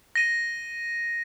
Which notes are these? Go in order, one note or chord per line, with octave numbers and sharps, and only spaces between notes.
A#6 D#7